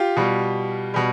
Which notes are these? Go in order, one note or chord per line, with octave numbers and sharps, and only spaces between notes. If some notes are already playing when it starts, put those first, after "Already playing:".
Already playing: F4 G4
B2 G3
B2 G3